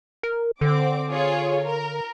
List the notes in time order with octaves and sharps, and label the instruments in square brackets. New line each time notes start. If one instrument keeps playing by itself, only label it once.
[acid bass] A#4
[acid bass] D3 [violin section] C4 D6
[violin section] F4 G#4 C#5
A#4